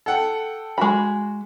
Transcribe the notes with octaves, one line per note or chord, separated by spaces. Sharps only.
A4 F#5 G5
G#3 F#4 B5